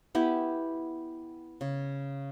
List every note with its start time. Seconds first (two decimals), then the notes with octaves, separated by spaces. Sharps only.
0.15 B3 E4 G4
1.61 C#3